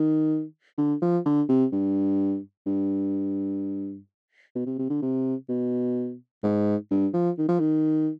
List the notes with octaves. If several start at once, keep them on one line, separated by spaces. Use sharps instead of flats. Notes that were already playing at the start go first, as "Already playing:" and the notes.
Already playing: D#3
D3
F3
D3
C3
G2
G2
B2
C3
C3
D3
C3
B2
G#2
G2
F3
D#3
F3
D#3